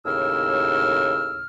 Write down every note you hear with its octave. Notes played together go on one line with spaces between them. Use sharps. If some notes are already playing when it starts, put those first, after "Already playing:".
D#2 A2 C#3 E6 F6